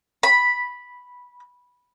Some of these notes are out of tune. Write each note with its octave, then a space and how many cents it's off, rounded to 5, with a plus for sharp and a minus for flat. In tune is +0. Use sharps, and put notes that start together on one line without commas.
B5 -5